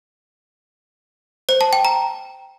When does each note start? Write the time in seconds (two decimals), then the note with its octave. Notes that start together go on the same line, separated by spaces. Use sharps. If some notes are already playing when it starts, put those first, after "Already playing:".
1.49 C5
1.61 A5
1.73 G5
1.85 A#5